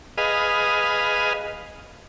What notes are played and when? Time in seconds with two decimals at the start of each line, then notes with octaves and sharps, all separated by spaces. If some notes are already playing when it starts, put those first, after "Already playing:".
0.18 G#4 B4 D#5 F5